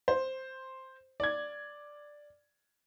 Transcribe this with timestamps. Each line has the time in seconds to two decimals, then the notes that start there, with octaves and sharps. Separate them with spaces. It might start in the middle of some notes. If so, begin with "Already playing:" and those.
0.08 C5
1.20 D5 G#6